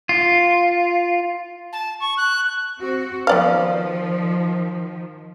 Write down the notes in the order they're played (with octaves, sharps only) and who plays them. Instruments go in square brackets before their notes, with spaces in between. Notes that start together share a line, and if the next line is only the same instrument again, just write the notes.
[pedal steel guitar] F4
[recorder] A5
C#6
F#6
[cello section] C4 F#4
[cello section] D#3 F3 [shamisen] B3 D5 F5